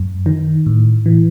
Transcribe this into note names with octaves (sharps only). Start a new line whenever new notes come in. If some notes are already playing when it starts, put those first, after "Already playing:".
Already playing: F#2
D#3
A2
E3